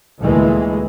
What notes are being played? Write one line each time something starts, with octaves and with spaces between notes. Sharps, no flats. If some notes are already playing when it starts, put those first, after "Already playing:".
D2 A#2 E3 G#3 A3